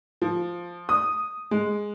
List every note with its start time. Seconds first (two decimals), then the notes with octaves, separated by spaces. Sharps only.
0.22 F3
0.89 D#6
1.51 G#3